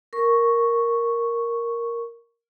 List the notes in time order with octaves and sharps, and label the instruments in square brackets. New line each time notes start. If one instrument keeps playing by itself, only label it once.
[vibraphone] A#4 C#6